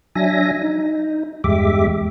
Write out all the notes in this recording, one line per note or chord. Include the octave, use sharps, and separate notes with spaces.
F#3 D4 E5 G#5 A#6
D#4
E2 G2 G#3 G4 E5 D6